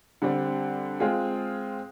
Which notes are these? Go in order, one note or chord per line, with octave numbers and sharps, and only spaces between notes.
D3 G3 C4
G#3 C4 F4 G#4